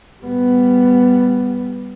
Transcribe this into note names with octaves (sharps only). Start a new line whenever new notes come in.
G3 B3